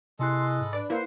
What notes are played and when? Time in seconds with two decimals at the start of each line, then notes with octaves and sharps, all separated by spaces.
0.19 C3 G#3 E4 A4 D#5 C6 F#6
0.60 G#2 B5
0.73 D4 B4 D5
0.90 A#3 E4 B4 C5 F5 F#5